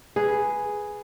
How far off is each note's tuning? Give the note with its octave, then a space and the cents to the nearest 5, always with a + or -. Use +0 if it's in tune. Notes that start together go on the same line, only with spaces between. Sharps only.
G#4 +0 B4 +0